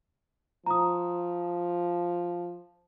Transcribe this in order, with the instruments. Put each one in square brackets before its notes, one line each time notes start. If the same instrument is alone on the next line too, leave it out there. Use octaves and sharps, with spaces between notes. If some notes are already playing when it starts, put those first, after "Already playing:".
[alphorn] F3 [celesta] A#5 D#6